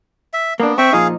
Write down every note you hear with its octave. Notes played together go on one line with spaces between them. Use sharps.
E5
A#3 B3 D4
C4 E5 G5 C#6
A#2 F3 D#4 G#4 F5